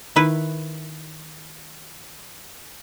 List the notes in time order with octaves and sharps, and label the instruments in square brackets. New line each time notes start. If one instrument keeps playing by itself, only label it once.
[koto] D#3 E4 B4